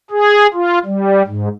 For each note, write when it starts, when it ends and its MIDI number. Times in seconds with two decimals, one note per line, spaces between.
0.11 0.47 68
0.54 0.79 65
0.86 1.23 55
1.27 1.48 44